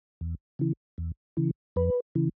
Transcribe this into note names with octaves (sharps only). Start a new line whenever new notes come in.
E2
C#3 E3
E2
C#3 E3
F2 B4
C#3 E3